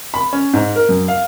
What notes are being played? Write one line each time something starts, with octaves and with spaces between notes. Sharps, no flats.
B5
C#4
G#2
A#4
F#2
F5